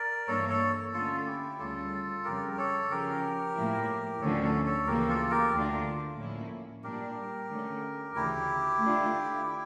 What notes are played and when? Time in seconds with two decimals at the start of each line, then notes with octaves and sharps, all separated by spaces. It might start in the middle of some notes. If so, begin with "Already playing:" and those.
Already playing: A#4 D5
0.27 G2 E3 A#3 D4 A4 C#5
0.49 A4 C#5
0.93 D3 A3 C#4 F4 A4
1.21 A4
1.25 E4 G4
1.59 D2 C#3 G3 C#4 F4 A4
2.24 F2 C#3 G3 G4 A#4
2.53 A#4
2.58 A4 C#5
2.90 C#3 F3 C#4 G4 A#4
3.56 A2 F3 A#3 E4
4.21 D2 D3 F3 C#4 A4 C#5
4.43 A4 C#5
4.65 A4 C#5
4.87 D2 C#3 E3 A#3 G4 A#4
5.08 F4 A4
5.31 G4 A#4
5.53 D2 D3 A3 D4 F4
6.18 A2 F3 A#3 C#4 E4
6.84 A#2 G3 D4 G4 A#4
7.50 D3 A3 C#4
8.15 D2 C#3 E3 E4 G4
8.81 D3 A3 D4 F4
9.46 E4 G4